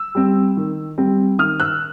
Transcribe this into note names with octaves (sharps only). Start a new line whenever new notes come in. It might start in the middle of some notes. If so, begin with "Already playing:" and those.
Already playing: E6
G3 C4
D#3
G3 C4
D#3 D#6 F6
E6 F#6